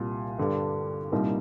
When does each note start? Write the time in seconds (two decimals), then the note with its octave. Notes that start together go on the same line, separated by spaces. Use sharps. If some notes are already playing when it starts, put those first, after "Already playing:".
Already playing: C2 A#2 G3
0.38 G2 D3 G3 D4 G4
1.12 C2 A#2 G3 A#3 D#4